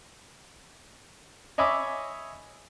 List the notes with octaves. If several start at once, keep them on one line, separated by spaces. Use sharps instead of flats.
C#5 D#5 E5 G#5 B5 D6